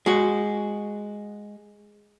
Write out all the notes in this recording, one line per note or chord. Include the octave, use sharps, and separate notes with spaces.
G#3 F#4